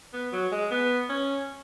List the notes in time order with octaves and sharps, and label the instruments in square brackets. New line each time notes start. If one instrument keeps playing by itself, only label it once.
[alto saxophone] B3
F#3
G#3
B3
C#4